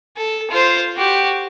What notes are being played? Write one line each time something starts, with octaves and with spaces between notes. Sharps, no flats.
A4
F4 C5
F#4 G4